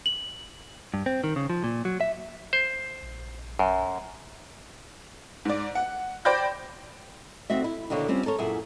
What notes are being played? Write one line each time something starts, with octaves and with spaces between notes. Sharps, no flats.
F#7
G2
C4
D#3
C#3
F3
A#2
F#3
E5
C5
A#1
F#2
G#2 D5
F#5
C5 D5 G5 B5 G6 A#6
D#2 A3 C4 F#4 E5
E4
D#2 B2 D3 A#3 C#5
G3 C4 C#4 F4
A4 A#4 C#5
F#2 A#2 E4 G#4 E5